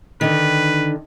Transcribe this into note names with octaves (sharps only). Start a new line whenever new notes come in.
D3 D#3 B4